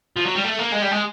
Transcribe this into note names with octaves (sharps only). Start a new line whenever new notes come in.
F3
F#3
G3
A3
A#3
G#3
G3
G#3